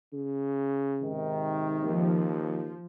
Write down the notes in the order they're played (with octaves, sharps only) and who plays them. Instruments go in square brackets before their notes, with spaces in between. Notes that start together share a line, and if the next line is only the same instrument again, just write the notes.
[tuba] C#3
[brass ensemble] G#2 C3 D#3
[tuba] D#2 [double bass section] F3